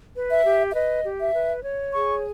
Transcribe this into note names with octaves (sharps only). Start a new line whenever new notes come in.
B4
E5
G4
E5
B4 D#5
G4
E5
B4
C#5
G#4 C#6